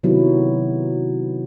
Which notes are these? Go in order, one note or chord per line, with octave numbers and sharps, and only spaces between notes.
C3 D#3 F#3 B3 E4